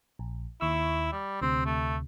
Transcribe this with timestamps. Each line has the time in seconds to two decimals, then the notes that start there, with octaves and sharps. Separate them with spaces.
0.19 A#1
0.61 D#2 E4 C#6 E6
1.12 G3
1.42 D2 C3 C4
1.65 A3